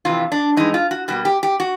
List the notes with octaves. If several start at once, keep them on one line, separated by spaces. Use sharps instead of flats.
F2 C3 E3 F4
D4
G2 E3 G#3 D#4
F4
F#4
B2 G3 A#3 F#4
G4
G4
F#4